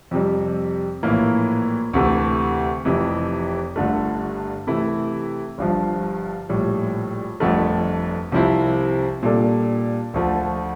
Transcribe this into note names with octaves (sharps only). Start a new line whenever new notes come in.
F2 C3 G3
A#1 A2 E3 A#3
D2 C3 E3 A3
F1 F2 C3 E3
G1 G2 D3 A3
C3 E3 A3 E4
G1 G2 F3
A#1 A2 G3
G1 F2 D3 A3
C2 C3 F3 C4 E4
A#2 G3 D4 A4
D2 D3 F3 A3